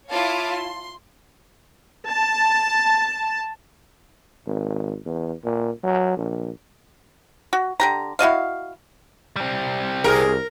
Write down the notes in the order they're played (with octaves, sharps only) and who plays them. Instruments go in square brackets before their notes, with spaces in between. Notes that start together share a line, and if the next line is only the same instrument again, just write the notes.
[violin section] E4 F4 C#5 F5 A5 D6
C6
[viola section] A5
[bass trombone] G#1
E2
A#2
F#3
A#1
[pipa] F#4
D3 G4 A#5
E4 F#4 D#5 F5
[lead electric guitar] G3 C4
[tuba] C2 [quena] G#4 [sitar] A#4